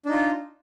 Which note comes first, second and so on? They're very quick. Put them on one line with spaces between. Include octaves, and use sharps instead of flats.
D4 D#4 F4